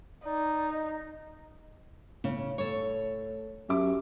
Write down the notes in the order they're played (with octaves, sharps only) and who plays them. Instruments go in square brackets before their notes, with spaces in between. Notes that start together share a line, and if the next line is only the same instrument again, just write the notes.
[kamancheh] D#4 [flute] D5
[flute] D#5
[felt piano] A2 [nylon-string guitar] C#3
[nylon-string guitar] A4 C#5
[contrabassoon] F#2 [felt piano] G4 E5 D6